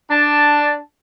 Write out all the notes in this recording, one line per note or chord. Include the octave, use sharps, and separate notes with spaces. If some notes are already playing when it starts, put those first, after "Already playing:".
D4 A5